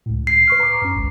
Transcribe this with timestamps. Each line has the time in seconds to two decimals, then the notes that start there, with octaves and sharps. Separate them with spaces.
0.06 C#2 A2
0.27 C7
0.48 B4 C#6 F6
0.60 A#5 C#6 D6
0.82 F#2 C#4
0.95 G#1 C#2